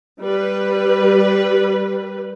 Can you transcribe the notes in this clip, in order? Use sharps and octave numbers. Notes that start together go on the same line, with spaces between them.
G3 B4